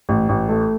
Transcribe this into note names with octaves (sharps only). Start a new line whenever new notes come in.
A1
A1
A3